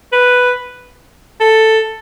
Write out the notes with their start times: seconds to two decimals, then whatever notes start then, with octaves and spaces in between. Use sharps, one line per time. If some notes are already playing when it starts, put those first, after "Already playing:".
0.13 B4
1.41 A4